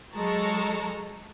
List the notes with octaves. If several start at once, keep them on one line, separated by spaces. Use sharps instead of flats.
F#3 G#3 A4 A5 A#5 C#6